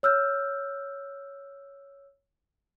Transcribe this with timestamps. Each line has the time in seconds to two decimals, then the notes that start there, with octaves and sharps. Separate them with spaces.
0.03 C#5 E6 F6 G6